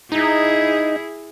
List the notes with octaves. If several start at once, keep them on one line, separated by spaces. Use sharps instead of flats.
D#4 E4 G#4